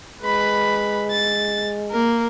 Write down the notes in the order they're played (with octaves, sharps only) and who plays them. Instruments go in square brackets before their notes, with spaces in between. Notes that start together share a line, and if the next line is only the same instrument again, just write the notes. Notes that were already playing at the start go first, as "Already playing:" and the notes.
[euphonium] G#3 [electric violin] B4 B5
[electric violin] A6
A#3 A#4